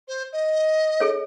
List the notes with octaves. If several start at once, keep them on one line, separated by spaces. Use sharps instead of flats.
C5
D#5
G#4 A4 C#5